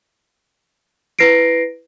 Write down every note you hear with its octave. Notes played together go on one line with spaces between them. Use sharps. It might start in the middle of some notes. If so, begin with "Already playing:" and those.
E4 B4 A#6 C7 D7